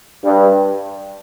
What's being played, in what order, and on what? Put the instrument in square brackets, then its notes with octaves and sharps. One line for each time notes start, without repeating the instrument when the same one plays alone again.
[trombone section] G2